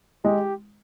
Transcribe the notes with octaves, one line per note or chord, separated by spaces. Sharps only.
G#3 G4